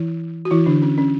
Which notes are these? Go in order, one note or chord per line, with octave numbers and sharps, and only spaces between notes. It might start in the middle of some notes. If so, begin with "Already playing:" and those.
Already playing: E3 E4
F#4
E3 E4
D3 D4
C#4
C#4